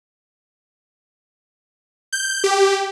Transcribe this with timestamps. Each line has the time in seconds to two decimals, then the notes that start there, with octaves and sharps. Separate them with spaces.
2.13 G6
2.44 G4